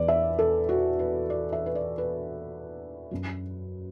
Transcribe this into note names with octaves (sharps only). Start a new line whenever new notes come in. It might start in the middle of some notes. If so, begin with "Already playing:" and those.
Already playing: E2 E3 D5
E5
A4
F#4
B4
D5
E5
B4
D5
B4
F#2 F#3